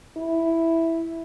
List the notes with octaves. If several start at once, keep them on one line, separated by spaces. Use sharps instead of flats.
E4